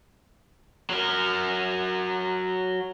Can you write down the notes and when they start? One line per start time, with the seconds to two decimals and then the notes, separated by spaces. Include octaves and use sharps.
0.90 F#3 A#4